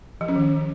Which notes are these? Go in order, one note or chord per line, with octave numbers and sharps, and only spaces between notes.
F3
C#4
D#3